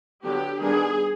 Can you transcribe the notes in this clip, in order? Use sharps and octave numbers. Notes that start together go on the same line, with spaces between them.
D3 F#3 B3 D4 G4
D#3 G3 B3 D4 G#4